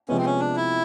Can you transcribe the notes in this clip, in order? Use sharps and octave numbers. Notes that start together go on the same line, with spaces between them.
C3 F3 G#3 B3 C#4
C4
C#4
D4
E4